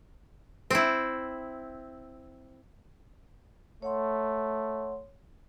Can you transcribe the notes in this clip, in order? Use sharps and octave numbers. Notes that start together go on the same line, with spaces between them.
C4 E4
A3 C#5 F#5 C6